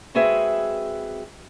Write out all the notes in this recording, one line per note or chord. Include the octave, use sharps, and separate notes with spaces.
G#3 C4 F#4 G#4 B4 E5